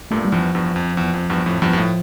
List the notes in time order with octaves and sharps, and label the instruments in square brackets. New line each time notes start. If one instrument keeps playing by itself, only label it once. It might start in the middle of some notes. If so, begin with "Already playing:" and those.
[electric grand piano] G2 A#2 [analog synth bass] A3
[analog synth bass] G3
[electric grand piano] E2 G2 [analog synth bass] F3
[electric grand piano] E2 G2
F2
E2
F2
E2 G2
F2 A2
[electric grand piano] E2 G2 [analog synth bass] F3
[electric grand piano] G2
A2